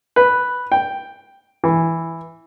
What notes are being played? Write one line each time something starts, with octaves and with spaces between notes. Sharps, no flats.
B4
G5
E3